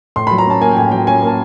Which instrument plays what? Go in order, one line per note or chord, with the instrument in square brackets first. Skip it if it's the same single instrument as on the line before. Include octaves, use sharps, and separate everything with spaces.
[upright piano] A2 C6
F#3 B5
A#5
C#4 A5
A#3 G#5
G5
A2 G#5
F#3 G5
C#4 G#5
A#3
A5